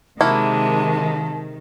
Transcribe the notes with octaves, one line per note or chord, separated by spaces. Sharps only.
C3 D#3 G#3 A#3 E4 F#4 A5